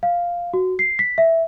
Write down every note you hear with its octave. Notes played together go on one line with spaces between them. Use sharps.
F5
F#4
C7
B6
E5